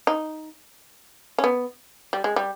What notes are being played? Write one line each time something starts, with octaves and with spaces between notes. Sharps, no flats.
D#4
C#4
B3
G3
G#3
G3